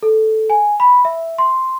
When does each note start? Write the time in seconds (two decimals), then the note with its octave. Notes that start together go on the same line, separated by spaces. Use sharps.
0.03 A4
0.50 G#5
0.80 B5
1.05 E5
1.38 C6